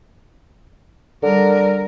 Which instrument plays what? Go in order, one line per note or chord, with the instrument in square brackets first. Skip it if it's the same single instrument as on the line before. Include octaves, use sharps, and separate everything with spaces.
[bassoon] D3 [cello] G3 A#4